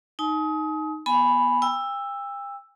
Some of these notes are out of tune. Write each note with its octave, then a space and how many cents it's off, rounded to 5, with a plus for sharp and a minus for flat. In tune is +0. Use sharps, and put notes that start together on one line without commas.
D#4 +0 G#5 +45 D#6 +30
B3 -15 G#5 +0 B5 +0
G5 +40 E6 +5